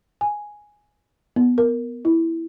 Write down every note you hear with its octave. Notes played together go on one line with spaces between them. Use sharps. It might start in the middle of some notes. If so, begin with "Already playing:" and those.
G#5
B3
A#4
E4